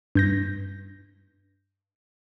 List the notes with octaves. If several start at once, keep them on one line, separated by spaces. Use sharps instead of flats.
G2 G6 A#6